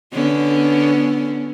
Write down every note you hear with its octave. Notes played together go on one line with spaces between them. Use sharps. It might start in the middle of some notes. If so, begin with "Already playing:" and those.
D3 B3 C#4